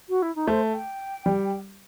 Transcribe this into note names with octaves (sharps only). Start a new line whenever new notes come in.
F#4
E4
D#4
A3 C5
G5
G3